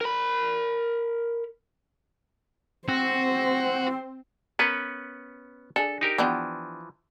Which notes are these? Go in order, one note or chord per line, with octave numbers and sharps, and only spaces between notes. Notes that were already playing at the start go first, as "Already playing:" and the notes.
A#4 B5
C4 F#4 C5
B3 C#4 A#4 B4
D4 G#4 A4
D#4 G4 A#4
E3 F3 B3 D4 G4